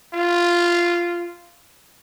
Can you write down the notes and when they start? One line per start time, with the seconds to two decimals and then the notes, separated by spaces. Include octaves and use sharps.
0.14 F4